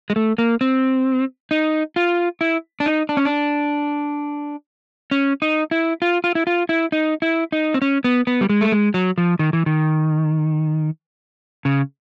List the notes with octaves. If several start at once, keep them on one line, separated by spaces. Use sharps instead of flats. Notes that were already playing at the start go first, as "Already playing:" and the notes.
G#3
A3
A#3
C4
D#4
F4
E4
D4
D#4
D4
C#4
D4
C#4
D#4
E4
F4
F4
E4
F4
E4
D#4
E4
D#4
C4
C#4
B3
B3
G3
G#3
A3
G#3
F#3
F3
D#3
E3
D#3
C#3